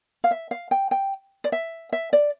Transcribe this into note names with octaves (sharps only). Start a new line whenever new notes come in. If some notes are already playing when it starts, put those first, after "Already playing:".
F5
E5
F5
G5
G5
D5
E5
E5
D5